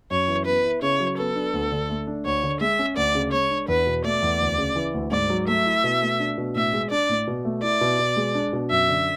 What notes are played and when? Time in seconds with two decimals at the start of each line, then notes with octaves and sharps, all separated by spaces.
0.11 F#2 C#5
0.28 E3
0.45 B3 B4
0.64 E4
0.82 C#3 C#5
1.00 F#3
1.18 B3 A4
1.36 D4
1.54 D2
1.72 D3
1.90 A3
2.07 D4
2.25 D2 C#5
2.43 D3
2.61 G#3 E5
2.79 C#4
2.96 D2 D5
3.15 C#3
3.32 G#3 C#5
3.51 D4
3.68 E2 B4
3.87 B2
4.05 A3 D5
4.23 E2
4.40 D2
4.58 C#3
4.76 E3
4.94 D2
5.11 G#2 D5
5.30 F#3
5.48 A3 E5
5.66 E4
5.84 B2
6.02 A3
6.20 D4
6.38 B2
6.55 A2 E5
6.73 G#3
6.91 D4 D5
7.09 A2
7.27 B2
7.45 A3
7.63 E4 D5
7.81 B2
7.99 B2
8.17 G#3
8.35 D4
8.53 B2
8.71 F#2 E5
8.88 D3